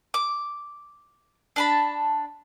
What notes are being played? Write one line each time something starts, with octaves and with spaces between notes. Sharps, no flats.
D6
D4 A5 B5